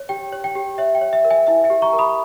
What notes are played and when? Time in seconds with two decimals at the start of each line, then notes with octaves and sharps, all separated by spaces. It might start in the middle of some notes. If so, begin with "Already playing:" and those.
Already playing: C#5
0.09 G4 G5
0.33 C#5
0.44 G5
0.55 G4
0.78 C#5 E5
0.95 G5
1.01 C#5
1.13 E5
1.25 A#4
1.31 E5 G#5
1.47 E4 E5
1.64 E5 G#5
1.70 G4
1.82 A#5 C#6
1.93 A#4
1.98 B5 D#6